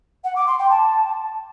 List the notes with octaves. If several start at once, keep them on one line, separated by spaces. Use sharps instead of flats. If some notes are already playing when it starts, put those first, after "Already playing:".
F#5
D6
C6
G5
A5